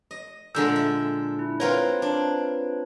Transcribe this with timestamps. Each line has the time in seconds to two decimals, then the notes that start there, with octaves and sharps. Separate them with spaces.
0.11 D#5
0.55 A#2 D3 G#3 E6 G6
0.76 E5
1.39 E4
1.60 C4 F4 A#4 B4 C#5
2.02 D4